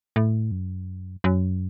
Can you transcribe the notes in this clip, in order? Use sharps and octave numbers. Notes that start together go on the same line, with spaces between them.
A2
F#2
F#2